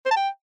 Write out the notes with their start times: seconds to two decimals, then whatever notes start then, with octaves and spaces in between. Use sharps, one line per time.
0.06 C5
0.11 A5
0.16 G5